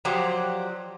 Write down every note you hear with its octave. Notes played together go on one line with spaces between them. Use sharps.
F3 F#3 G4 C5 D5